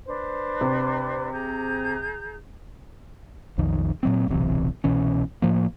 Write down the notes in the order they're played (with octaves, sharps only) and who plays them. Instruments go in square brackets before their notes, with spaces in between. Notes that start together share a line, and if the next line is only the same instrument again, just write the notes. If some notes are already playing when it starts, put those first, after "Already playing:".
[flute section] D4 B4 C5
[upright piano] C3
[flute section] G#4 A#5 G6
[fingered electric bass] B1 F2 D#3
A#2 F#3 C4
D1 B1 C3 E3
C2 B2 E3 C#4
A2 F3 A#3